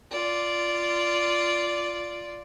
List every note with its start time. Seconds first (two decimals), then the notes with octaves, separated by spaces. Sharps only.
0.11 F4 D5